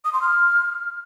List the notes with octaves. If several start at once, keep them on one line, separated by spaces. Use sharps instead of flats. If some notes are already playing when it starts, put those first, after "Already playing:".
D#6
C6
F6